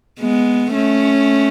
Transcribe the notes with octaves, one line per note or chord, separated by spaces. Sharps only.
G#3 B3
A3 C#4